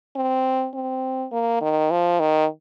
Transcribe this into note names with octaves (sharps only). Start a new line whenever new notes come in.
C4
C4
A#3
D#3
F3
D#3